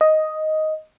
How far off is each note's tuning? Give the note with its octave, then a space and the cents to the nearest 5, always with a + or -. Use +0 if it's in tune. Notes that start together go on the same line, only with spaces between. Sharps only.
D#5 +5